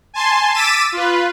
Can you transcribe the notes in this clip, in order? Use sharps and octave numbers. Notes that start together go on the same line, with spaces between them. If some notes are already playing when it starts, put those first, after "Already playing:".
G#5 A5 C6
D6 E6 A6 B6 D#7 E7
F4 B4